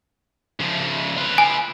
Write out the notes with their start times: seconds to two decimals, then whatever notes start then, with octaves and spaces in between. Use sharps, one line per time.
0.60 C#3 F3
1.17 F4 B4
1.38 G#5